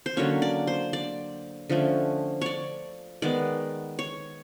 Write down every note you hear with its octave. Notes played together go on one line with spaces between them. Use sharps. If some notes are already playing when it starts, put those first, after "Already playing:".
C5
D3 F#3 A#3 C#4 C#5
D5
C5
D5
D3 F3 A3 C#4
C#5 D5
D#3 G#3 B3 D5
C#5